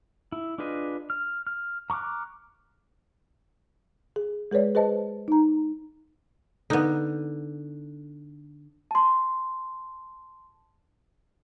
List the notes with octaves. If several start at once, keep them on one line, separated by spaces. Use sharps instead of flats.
E4
D4 F4 G#4 B4 D#5
F6
F6
A#5 C#6 D6 F6 F#6
G#4
G#3 G#4 B4 C#5 D5
G#4 B4 C5 D#5 A5
D#4 A#5
D3 B3 D#4
A5 C6